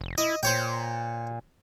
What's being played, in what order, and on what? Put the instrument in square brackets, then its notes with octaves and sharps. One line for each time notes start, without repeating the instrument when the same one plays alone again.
[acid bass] F1
[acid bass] E4 [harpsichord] D#5
[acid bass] A#2 [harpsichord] C5 C#5 G5